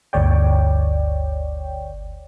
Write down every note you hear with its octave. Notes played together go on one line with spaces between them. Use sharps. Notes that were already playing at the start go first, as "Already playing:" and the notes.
G1 D2 C#5 D5 G5